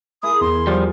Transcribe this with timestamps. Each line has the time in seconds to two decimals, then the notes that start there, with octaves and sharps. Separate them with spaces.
0.23 E4 G#4 A#4 D#6
0.41 E2 C6
0.67 F3 G3 F4